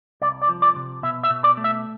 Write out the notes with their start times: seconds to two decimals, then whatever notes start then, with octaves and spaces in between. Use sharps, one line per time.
0.21 C2 D5
0.42 D5
0.49 F3
0.62 D5
0.76 C3
1.03 B2 E5
1.23 E5
1.30 B2
1.44 D5
1.57 A3
1.64 E5